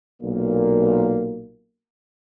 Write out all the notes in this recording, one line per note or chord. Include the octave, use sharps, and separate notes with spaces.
B1 A#2 A#3